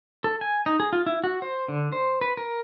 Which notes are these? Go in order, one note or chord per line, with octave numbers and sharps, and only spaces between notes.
A4
G#5
D#4
G#4
F4
E4
F#4
C5
D3
C5
B4
A#4